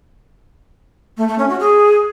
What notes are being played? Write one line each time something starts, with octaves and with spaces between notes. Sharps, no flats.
A3
A3
C#4
F#4
G#4